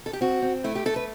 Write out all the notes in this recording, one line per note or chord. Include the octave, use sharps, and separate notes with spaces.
A4
G4
C4 F#4
C4
A3 E4
G4
A3 A4
B4